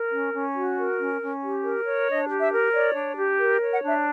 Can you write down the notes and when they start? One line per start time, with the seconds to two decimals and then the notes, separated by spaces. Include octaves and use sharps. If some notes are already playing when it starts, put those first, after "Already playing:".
Already playing: A#4
0.11 C#4
0.33 C#4
0.55 F#4
0.78 A#4
0.99 C#4
1.21 C#4
1.42 G4
1.64 A#4
1.85 C#5
2.08 D4 D#5
2.30 G4
2.41 E5
2.51 A#4
2.73 C#5 D5
2.95 D4
3.17 G4
3.39 A#4
3.61 C#5
3.71 F#5
3.82 D4
3.88 E5